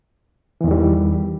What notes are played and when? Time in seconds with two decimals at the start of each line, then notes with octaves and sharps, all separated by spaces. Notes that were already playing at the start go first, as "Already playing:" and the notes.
0.61 E3
0.64 E2
0.68 D#3
0.71 G3